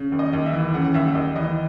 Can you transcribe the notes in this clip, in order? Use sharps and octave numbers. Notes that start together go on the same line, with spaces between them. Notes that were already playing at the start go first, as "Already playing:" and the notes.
Already playing: C#3
D#2
D#5
D#2
E5
E3
C#3 F#5
F#5
D#2 E5
D#2 D#5
E3 D#5